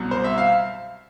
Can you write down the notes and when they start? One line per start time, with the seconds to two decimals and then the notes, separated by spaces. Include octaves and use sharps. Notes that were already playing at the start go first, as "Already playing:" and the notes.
Already playing: C2 B2 F#3
0.11 C5
0.24 E5
0.38 F5